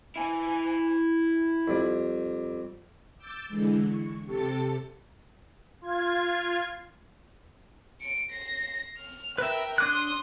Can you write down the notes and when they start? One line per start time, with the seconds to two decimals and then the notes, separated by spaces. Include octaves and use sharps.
0.16 E4 G#5
1.68 F2 G3
3.16 D6 E6 G6 A6
3.48 D3 E3 G#3
3.84 C#6
4.25 C3 G4 A4 A5 A6 C#7
5.81 F4 G#6
8.00 C#7 D7
8.30 A#6 C7
8.98 F6
9.38 A#4 B4 E5 G5
9.78 D4 C6 D6 D#6 F#6